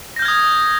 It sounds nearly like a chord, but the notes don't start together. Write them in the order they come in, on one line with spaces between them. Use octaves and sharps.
A#6 G6 F6 G#6 D#6